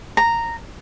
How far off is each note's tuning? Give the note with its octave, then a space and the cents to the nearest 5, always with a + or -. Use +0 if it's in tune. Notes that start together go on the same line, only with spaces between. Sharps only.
A#5 -10